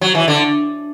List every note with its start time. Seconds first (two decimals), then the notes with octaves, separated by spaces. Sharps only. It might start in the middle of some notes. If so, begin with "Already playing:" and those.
0.01 F#3
0.15 E3
0.28 D3